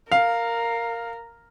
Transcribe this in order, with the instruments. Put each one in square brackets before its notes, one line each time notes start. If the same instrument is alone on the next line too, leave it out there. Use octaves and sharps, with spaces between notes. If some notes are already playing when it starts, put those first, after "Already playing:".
[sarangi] A#4 [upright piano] F5